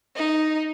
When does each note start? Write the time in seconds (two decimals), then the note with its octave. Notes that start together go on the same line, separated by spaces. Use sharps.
0.15 D#4